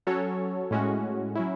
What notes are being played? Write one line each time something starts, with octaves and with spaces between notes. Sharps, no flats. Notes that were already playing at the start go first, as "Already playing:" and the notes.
F#3 C#4 F#4 A4 C#5
A2 G#3 C#4 F#4
F#3 C#4 E4